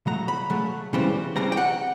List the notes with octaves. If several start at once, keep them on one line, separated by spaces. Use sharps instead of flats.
C#3 F#3 A3 A#5
B5
C#3 F#3 A3
C#2 C#3 E3 G3 C4
C#2 C#3 E3 G3 C4 A#5
G5
F#5